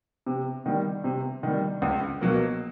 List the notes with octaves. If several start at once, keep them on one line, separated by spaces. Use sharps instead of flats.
C3
D#3 G3
C3
D#3 G3
C#2
B2 F#3 A#3